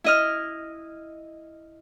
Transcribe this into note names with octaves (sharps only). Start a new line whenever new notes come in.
E4 D#5 F6